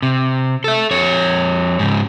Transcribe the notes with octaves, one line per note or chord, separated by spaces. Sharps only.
C3
A4 E5
F2 C#5
G#2 C#3